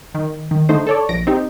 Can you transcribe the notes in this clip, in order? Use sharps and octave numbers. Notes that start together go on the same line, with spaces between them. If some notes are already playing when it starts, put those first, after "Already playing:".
D#3
D#3
D3 A3 D#4 C5
A4 C#5 D5
A#1 A#6 D7
C4 D#4 G4